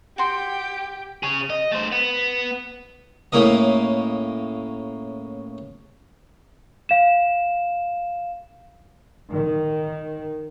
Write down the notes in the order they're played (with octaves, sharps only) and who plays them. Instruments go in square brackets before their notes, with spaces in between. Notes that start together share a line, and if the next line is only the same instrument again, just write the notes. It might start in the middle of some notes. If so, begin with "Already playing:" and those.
[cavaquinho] F#4 C6 [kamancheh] G4 G5
[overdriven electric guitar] G#4 C#5
D#5
A3 C5
B3
[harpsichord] A2 C#3 A#3 E4 A#4 D#5
[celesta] F5 E7
[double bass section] D#3